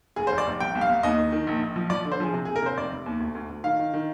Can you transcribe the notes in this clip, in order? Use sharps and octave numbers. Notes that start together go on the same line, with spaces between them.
F1 G#4
C5
F1
D5
F1
C2 G5
C2
F5
C2
D#2 D#5
D#3
D#3
A#1
A#1
F3
F3 D5
D3
C5
F3 G#4
C3
C3 G#4
A#4
C3 C5
F1 D5
F1
D#2
D2
D2
D2
D#3 F5
D#3
D#3